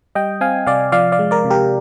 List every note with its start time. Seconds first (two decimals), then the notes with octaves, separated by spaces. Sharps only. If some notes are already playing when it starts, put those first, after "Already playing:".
0.15 G3 D#5 G5
0.41 C4 F5 G#5
0.66 C3 D5 F5
0.92 F3 D5 F5
1.12 D5 F5
1.19 G#3
1.31 A#4 D5
1.45 C3
1.50 G4 A#4